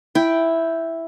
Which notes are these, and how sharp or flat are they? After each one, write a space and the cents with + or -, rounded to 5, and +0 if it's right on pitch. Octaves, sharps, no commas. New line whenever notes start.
E4 +0 G5 +0